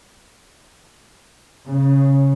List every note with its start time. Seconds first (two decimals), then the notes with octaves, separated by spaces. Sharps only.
1.68 C#3